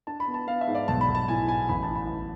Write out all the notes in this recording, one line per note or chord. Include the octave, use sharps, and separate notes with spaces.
D4 A5
B5
B3
A5
B3 F5
E5
G#2
D5
B1 A5
B5
B1
A5
A2 G#5
A2 G#5
A1 B5
A5
A2
B5
A1